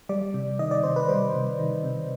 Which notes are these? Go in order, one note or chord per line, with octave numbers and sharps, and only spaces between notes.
G3 D5
C3
D#3 D#5
D5
C3 C5
B4
G3 C5
C3
D#3
C3